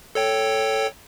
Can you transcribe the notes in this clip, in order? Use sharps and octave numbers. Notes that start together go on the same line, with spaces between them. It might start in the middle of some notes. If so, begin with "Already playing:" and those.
A4 C#5 G5